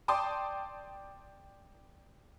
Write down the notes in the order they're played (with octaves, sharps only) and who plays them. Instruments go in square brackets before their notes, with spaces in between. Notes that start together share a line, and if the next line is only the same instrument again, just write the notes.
[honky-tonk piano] D5 G5 A5 C6 D6 D#6